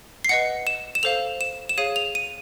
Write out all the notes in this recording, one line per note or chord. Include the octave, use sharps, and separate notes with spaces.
C7
B4 D#5 F#5 C#7
E7
E7
A4 C5 F5 F7
E7
E7
G#4 C#5 F5 D#7
F7
D#7